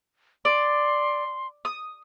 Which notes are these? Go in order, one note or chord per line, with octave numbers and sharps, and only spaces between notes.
D5 C6
D#6